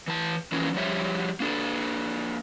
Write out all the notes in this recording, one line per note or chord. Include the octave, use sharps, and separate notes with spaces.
E3 A5
E3 F3 A#3 C#4
F3 G3 C#5 E5
A#3 D4 A4